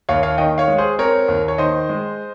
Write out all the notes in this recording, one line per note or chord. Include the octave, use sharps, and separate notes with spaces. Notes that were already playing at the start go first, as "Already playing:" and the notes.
D#2 C#5 F5
C#5 F5
D#3 D#5 G5
C#5 F5
G#3
G#4 C5
C4 A#4 C#5
D#2
C#5
D#3 C5 D#5
G#3